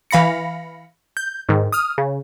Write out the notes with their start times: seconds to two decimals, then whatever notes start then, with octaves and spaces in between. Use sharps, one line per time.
0.11 E3 F5 B5 A#6 C#7
1.17 G6
1.49 G#2 D#3
1.72 D#6 F6
1.98 C#3